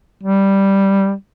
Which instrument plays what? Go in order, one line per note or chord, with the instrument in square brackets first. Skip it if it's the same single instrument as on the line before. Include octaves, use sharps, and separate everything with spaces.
[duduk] G3